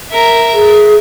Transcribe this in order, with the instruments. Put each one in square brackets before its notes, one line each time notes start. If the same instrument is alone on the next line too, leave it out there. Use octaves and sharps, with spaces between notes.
[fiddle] A#4 E5
[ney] G#4